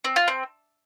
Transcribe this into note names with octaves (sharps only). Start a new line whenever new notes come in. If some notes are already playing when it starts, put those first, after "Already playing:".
C4
F4
C4